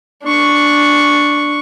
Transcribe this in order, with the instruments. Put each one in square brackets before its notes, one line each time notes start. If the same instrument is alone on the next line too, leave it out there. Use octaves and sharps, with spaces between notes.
[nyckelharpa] D4 C#6